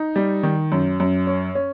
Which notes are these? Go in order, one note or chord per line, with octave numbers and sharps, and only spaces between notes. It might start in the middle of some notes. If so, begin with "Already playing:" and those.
Already playing: D#4
G3
D#3
F#2
F#2
C#4
C#4